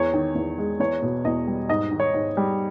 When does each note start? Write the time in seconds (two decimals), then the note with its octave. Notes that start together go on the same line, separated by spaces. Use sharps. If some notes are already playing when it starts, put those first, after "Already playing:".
Already playing: E2 C#5
0.14 D#3
0.35 E2
0.58 G#3
0.80 E2 C#5
1.02 B2
1.25 E2 D#5
1.47 G3
1.69 G#2 D#5
1.91 D#3
2.00 C#5
2.14 G#2
2.37 G3